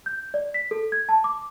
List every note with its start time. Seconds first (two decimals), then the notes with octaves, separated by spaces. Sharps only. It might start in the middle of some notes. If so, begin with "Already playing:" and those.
0.06 G6
0.34 D5
0.54 B6
0.71 A4
0.92 G#6
1.09 A5
1.24 D6